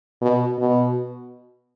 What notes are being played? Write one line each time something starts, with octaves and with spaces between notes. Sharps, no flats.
B2
B2